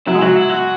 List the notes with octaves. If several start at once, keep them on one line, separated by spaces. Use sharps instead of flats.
F#3 E4
G#3
F#3 F#4
E4
F#4